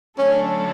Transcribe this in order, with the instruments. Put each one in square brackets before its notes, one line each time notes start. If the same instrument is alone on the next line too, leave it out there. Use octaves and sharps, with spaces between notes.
[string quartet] D3 F#3 A3 D4 A4 [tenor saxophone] C#4